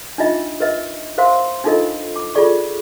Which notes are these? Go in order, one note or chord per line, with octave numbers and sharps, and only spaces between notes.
D4 D#4 F4 D#5 E5
A#4 B4 D#5 E5
A#4 C5 E5 F5 C6
D4 D#4 F4 A4 A#4 D#5
D6
F4 G#4 A4 D5 C#6